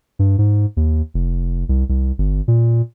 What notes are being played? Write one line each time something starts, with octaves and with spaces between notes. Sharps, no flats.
G2
G#2
D#2
F1
C2
C2
G1
A#2